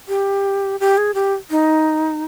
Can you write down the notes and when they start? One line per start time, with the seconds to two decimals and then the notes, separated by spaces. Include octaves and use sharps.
0.08 G4
0.80 G4
0.97 G#4
1.14 G4
1.51 D#4